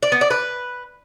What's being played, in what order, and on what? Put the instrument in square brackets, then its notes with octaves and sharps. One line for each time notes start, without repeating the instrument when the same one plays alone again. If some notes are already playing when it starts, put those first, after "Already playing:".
[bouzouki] D5
B3
D5
B4